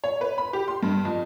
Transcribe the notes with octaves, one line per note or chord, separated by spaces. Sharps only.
C#5
B4
B5
G4
C6
G2
F2